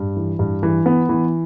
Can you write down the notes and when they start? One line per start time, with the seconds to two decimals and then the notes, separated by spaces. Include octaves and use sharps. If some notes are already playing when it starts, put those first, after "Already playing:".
Already playing: G2
0.17 E3
0.39 G2
0.63 E3
0.86 B3
1.09 E3